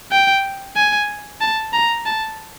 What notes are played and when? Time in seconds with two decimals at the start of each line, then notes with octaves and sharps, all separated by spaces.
0.12 G5
0.76 G#5
1.41 A5
1.73 A#5
2.06 A5